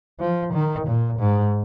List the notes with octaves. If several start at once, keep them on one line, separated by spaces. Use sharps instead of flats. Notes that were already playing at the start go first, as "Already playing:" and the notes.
F3
D#3
A#2
G#2